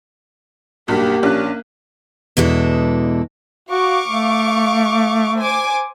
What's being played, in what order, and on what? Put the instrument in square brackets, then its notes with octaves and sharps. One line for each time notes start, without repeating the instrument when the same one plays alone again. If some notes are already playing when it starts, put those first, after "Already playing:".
[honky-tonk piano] B1 G2 B6 [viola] A#3 [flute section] G4
[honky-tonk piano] A#1 F#6 [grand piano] C#4 D4
[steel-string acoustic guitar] E2 B2 G#3 D4 E4 A4
[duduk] F#4 [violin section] F5 C#6 D6
[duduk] A3
[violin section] C5 G#5 D6